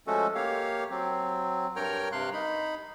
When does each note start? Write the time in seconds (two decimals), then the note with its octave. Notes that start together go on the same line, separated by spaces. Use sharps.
0.07 F3 G#3 A3 C#4 F#4 A4
0.35 A#3 G4 C#5 F5
0.90 F#3 C4
1.76 G2 A#4 C#5 G5 A#5 F6
2.12 G2 C3 F5 C6 F#6
2.33 D#4 B5